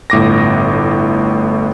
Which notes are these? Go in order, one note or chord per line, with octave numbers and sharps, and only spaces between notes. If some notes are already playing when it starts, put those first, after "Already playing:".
G1 A2 D6 A#6